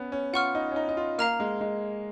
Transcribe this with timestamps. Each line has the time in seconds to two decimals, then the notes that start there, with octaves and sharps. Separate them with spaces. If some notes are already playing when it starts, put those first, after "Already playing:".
Already playing: B3 C#4
0.12 C#4
0.33 F4 F#5 C#6 F6
0.55 D#4
0.72 C#4
0.76 D#4
0.89 D#4
0.97 F4
1.18 A#3 F5 A#5 F6
1.40 G#3
1.61 G#3